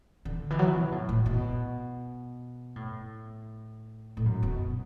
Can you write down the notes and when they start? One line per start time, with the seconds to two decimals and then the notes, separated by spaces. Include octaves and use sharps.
0.25 D3
0.50 E3
0.59 F#3
0.67 E3
0.75 B2
0.92 A2
1.09 A2
1.26 B2
2.76 A2
4.17 A2
4.26 F#2
4.43 B2